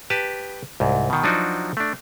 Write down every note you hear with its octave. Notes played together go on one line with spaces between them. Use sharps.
G4 B4 A5
C2 G#2
B2 D#3
F3 F#3 D4 D#4 F#4
A3 D4